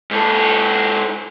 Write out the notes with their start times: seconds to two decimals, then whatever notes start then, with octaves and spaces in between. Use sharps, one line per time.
0.11 G#2 A4